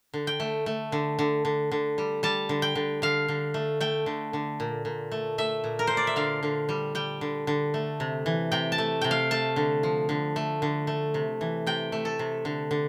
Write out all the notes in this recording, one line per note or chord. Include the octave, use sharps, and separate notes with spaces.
D3
G5
A3
A3
D3
D3
D3
D3
G3
G3 A5
D3
G5
D3
D3 F5
D3
A3
A3 G5
D3
D3
A#2
A#2
A3
A3 E5
A#2
A#4
A#2 C5
D5
E5
D3 F5
D3
G3
G3 G5
D3
D3
A3
C3
E3
C3 G5
A5
A3
C3 G5
F5
A3 A5
D3
F3
D3
A3
D3
A3
C3
E3
C3 G5
A3
A4
C3
D3
D3